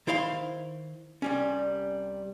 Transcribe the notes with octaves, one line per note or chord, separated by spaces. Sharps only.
D#3 E4 C5 F5 A#5 C6
C2 G3 C#4